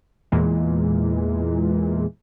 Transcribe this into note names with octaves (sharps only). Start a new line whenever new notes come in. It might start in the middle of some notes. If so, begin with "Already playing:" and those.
E2 A#2 E3 G#3